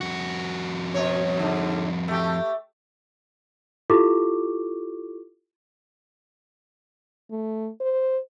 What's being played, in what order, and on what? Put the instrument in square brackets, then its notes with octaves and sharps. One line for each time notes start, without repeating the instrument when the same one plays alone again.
[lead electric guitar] F2 F#4
[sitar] B2 C#5
G#2 D3
A3 G4
[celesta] E4 F4 G4 A4 C#6 D6
[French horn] A3
C5